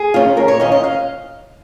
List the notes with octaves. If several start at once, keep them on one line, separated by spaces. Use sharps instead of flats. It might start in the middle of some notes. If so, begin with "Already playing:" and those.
Already playing: G#4
D#3 C#4 F4
D#2 A#4
C#5
D#3 C#4 F4 D#5
D#5
F5